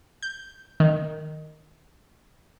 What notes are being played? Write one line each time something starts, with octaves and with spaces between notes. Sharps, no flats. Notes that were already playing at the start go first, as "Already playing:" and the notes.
G6
D#3